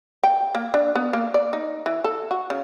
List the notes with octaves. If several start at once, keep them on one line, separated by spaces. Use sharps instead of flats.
G5
A#3
D4
B3
A#3
D5
D#4
E3
A4
F#4
C#3